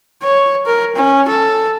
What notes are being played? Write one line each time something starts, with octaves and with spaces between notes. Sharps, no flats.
C#5
A#4
C#4
A4